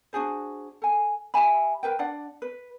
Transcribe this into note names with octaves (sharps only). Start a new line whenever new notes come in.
D4 F#4 G#4 C5
A4 G#5
G4 E5 G#5 B5
A#4 B4 G5
D4 D5 F#5
B4